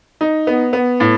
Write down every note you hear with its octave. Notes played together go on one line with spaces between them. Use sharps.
D#4
B3
B3
A2